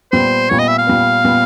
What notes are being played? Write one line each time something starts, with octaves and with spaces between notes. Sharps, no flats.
A#2 G3 B3 C5
A#2 G3 B3 C#5
D#5
E5
F5
A#2 G3 B3
A#2 G3 B3